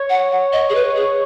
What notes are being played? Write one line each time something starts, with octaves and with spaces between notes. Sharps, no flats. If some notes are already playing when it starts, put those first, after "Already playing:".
Already playing: C#5
F#5
F#5
D#5
G#4
B4
G#4